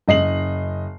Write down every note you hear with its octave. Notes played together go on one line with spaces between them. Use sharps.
F#1 D#5 C7 F#7